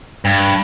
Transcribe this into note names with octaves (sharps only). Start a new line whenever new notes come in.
G2